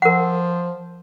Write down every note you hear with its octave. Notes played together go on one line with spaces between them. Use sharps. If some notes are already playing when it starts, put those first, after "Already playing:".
F3 A#4 F#5